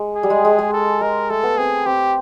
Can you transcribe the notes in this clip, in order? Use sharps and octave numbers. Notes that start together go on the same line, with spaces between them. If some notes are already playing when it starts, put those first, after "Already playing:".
Already playing: G#3
G#4
G3
G#3
G#3
G#3
A4
G#3 A#4
A3 A4
B3
C4 G#4
C4 G4